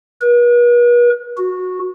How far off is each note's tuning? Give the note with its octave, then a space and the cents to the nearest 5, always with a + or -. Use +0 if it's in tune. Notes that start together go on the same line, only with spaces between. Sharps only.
B4 -45
F#4 -10